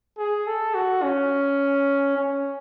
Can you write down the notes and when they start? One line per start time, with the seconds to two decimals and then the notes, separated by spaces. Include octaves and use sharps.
0.18 G#4
0.47 A4
0.75 F#4
1.03 C#4
2.17 C#4